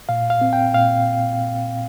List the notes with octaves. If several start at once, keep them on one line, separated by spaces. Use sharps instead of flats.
A#2 F5
F5
C4
G5
A#2 F5